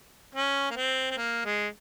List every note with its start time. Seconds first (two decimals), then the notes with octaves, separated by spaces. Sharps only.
0.35 C#4
0.71 A#3
0.76 C4
1.11 C4
1.17 A#3
1.45 G#3